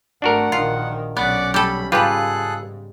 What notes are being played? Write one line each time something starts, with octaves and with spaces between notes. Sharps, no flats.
G#1 A3 D4 F#4 A#4 F#5
A#1 D#3 F4
B1 B3 C#4 D5 F#5 D6
G3 A4 B5
G#2 C#3 G3 F4 G#4 A4 B4 F#6